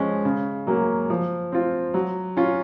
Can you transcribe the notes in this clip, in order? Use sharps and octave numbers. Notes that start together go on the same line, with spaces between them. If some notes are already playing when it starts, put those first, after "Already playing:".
Already playing: F3 G#3 C#4
C#3
F#3 A#3 C#4
F3
C4 F4
F#3
C#4 F4